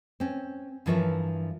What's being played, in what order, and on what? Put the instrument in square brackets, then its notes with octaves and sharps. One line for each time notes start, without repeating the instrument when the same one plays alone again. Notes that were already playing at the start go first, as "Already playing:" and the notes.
[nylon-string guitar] C4 C#4
G2 E3 F3 A#4 C#5 E5